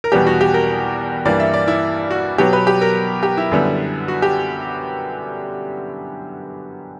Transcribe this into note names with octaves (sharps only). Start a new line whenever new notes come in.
A#4
E2 B2 G3 B3 G4
F#4
G4
A#4
G2 E3 G3 A#3 D5
E5
D5
E4
F#4
B2 F#3 B3 G4
B4
G4
A#4
G4
E4
F#2 D3 G3 B3
F#4
G4